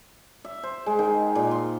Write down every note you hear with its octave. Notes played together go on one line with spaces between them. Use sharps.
E5
C5
G#3
D#3
A#2
C6